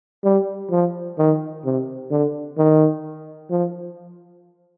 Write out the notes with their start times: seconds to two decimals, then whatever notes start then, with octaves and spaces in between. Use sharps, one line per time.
0.24 G3
0.71 F3
1.18 D#3
1.65 C3
2.11 D3
2.58 D#3
3.50 F3